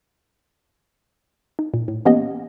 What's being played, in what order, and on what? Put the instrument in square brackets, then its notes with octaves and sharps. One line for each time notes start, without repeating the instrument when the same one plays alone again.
[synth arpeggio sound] D#4
A#2
A2
E3 A#3 B3 C#4 G4 D#5